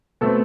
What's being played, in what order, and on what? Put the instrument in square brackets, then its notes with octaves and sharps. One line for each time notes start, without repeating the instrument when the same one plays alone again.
[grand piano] B2 A3 C4 A4